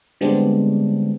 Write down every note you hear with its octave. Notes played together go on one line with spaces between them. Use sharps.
D3 G3 G#3 B3 C4 D4